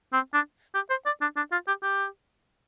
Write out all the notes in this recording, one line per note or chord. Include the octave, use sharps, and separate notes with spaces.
C4
D4
G4
C5
D5
D4
D4
F4
G4
G4